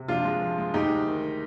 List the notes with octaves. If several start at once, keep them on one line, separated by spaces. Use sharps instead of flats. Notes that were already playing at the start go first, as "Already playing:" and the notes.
Already playing: C3
F3 D4 F4
G#3
F3
G#3
D2 D#4 G4
D2
D#3